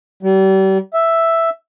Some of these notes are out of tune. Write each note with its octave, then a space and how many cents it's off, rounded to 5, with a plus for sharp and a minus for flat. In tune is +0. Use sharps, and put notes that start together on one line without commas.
G3 -35
E5 +0